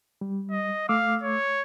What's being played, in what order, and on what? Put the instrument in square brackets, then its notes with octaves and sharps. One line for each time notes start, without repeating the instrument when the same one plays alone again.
[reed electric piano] G3
[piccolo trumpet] D#5
[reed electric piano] A3 D6 E6 [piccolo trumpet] F5
[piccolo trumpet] C#5